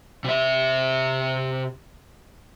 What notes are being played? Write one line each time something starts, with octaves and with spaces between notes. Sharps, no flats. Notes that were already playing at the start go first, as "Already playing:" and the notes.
C3 E5